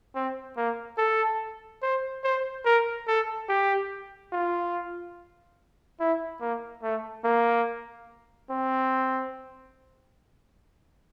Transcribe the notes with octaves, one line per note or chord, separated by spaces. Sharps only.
C4
A#3
A4
C5
C5
A#4
A4
G4
F4
E4
A#3
A3
A#3
C4